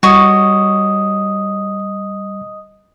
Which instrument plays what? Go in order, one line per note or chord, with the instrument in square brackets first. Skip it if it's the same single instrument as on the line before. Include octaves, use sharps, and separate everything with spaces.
[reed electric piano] G3 [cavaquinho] F#4 C#5 [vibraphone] D#5 D#6